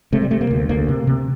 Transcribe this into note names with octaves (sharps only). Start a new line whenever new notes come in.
C3 A3
G3
C3 A3
A#3
D2
D2 A#3
C3
C3